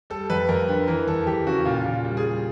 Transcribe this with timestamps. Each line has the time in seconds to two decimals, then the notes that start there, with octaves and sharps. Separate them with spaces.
0.10 G3 A4
0.30 F2 B4
0.49 F2 A#4
0.68 D3 B4
0.87 E3 A#4
1.07 E2 A4
1.27 E2 G4
1.46 C#3 F#4
1.66 A#2 F4
1.85 A#2
2.05 G3
2.17 G#4
2.24 G3